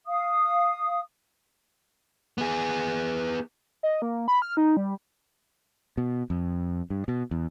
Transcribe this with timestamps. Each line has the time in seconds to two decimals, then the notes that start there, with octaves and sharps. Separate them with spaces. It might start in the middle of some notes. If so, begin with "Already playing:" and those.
0.06 F5 D#6
2.38 B3 G#4
3.83 D#5
4.02 A#3
4.28 B5
4.42 F6
4.57 D#4
4.77 G3
5.98 B2
6.30 F2
6.90 G2
7.08 B2
7.31 E2